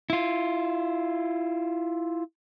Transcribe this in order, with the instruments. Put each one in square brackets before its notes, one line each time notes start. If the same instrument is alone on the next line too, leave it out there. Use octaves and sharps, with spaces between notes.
[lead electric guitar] E4 F4